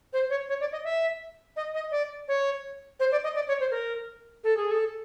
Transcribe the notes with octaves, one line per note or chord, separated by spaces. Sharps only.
C5
C#5
C#5
D5
D#5
E5
D#5
D#5
D5
C#5
C5
D5
D#5
D5
C#5
C5
A#4
A4
G#4
A4